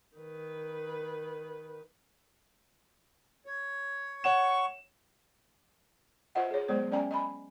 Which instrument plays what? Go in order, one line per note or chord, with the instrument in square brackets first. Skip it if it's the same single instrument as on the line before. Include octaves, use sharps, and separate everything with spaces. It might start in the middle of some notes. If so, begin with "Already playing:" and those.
[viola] D#3 B4
[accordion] C#5
[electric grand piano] C#5 F#5 E7 [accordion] C#6
[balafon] F4 B4 C5 D#5 E5 F#5
G#4 C#5
F#3 G#3 B3 C5 D5
C#4 D5 E5 G5 G#5 A#5
D#5 G#5 B5